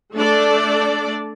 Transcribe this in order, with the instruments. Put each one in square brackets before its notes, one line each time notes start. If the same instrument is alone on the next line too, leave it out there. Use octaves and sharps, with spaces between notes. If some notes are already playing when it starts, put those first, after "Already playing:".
[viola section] A3 D4 A4 D5